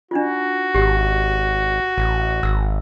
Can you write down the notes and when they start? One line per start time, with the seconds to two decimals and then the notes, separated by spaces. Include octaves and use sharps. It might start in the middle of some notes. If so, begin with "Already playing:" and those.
0.11 D4 D#4 F4 F#4
0.75 G#1 G4
1.98 A1
2.43 G#1 E6